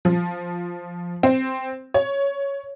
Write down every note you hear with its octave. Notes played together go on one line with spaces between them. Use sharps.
F3
C4
C#5